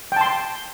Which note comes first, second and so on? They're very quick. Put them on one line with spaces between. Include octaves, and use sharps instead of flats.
G5 A5 C6